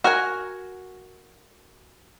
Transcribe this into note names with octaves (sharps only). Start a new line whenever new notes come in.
F#4 A#4 F#5 G#5